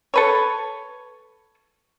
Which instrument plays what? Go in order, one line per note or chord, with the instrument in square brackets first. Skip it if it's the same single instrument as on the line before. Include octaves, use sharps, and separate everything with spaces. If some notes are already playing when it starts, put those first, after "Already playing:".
[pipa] A4 B4 C#5